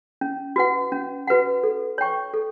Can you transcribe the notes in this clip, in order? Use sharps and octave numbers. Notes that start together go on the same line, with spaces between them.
C#4
F#4 B4 F#5
C#4
F#4 B4 F#5
A4
C#5 G5 C#6
A4